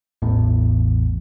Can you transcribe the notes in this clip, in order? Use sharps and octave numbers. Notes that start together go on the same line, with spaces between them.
A1 E2 A2